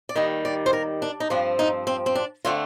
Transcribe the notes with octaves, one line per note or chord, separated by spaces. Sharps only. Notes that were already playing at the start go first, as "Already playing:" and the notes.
D5
D#2 D#3 G3 D#5
D5
C5
A#4
D4
D#4
G2 F3 C4 D4
D#4
C4
C4
D4
D3 A3 C4 F4